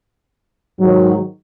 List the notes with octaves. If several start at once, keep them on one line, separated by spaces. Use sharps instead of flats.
G#2 D#3 F#3